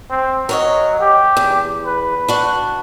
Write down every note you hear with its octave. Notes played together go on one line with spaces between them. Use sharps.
C4
F#3 A#4 C#5 D#5
G4
E2
B4
D4 F#4